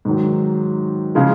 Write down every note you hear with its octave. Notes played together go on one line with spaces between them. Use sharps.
G#2 D#3 F#3
C#3 F3 G#3